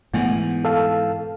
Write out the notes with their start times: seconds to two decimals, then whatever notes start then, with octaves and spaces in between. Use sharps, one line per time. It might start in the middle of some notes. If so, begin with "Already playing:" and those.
0.14 G#2 E3 A3 B3 F#5
0.65 A4 F5 A5